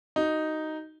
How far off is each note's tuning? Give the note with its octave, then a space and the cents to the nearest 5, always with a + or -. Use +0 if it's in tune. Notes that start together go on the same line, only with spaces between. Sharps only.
D#4 +0 F#4 +25